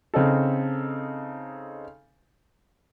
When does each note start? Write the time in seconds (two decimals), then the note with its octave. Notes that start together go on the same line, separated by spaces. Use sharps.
0.14 C#3 C4 D#4 A4